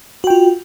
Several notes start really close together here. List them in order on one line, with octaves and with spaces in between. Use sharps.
F#4 G5 F4